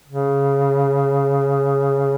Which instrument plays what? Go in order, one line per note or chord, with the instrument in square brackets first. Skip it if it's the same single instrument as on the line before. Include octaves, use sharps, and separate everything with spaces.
[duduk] C#3